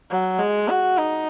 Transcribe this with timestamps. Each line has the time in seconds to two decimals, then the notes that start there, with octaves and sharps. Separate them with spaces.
0.10 F#3
0.39 G#3
0.69 F#4
0.97 D#4